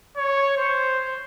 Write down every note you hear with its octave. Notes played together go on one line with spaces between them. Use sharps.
C#5
C5